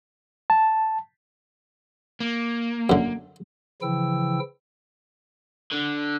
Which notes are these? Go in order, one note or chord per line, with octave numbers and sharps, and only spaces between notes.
A5
A#3
F#2 D3
C#3 E3 F3 E4 G5 E6
D3